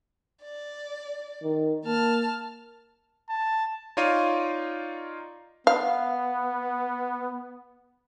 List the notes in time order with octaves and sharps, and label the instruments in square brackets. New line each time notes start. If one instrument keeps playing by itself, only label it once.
[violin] D5
[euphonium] D#3
[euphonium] A#3 [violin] A5 F6
[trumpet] A5
[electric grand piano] D#4 F4 C#5 D5 F5 D#7
[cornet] B3 [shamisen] F5